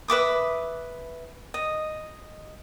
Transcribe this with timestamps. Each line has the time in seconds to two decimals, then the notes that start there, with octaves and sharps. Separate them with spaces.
0.08 B4 E5 D6 D#6
1.54 D#5